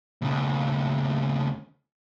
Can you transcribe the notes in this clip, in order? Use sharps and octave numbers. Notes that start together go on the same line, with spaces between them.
D#2 C#3